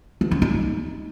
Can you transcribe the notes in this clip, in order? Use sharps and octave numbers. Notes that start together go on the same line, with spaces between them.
E3
C#4
D#4